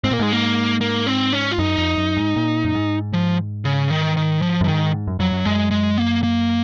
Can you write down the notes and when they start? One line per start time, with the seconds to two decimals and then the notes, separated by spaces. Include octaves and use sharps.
0.04 G#2 C4
0.11 A#2 A#3
0.19 G#2 G#3
0.32 A#3
0.81 A#3
1.07 C4
1.33 C#4
1.52 F4
1.58 F#2 D#4
1.78 F2
1.97 F#2
2.17 G#2
2.36 A#2
2.64 F#2
2.75 G#2
3.13 F3
3.65 C#3
3.90 D#3
4.17 D#3
4.42 F3
4.61 F#2
4.64 F3
4.68 G#2 D#3
5.07 F#2
5.19 F2 F#3
5.32 F#2
5.45 F#2 G#3
5.71 G#3
5.98 A#3
6.23 A#3